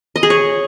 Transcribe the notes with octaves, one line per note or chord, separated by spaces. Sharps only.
D#5
G#4
C#5